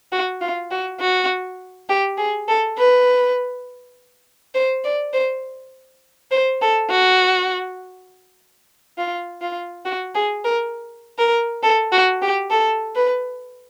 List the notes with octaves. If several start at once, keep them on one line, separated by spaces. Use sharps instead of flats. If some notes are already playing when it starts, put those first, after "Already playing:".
F#4
F4
F#4
F#4
G4
G#4
A4
B4
C5
D5
C5
C5
A4
F#4
F4
F4
F#4
G#4
A#4
A#4
A4
F#4
G4
A4
B4